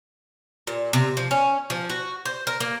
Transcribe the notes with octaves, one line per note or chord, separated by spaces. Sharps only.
A#2
C3
F3
C#4
F3
F#4
C5
A#4
A#3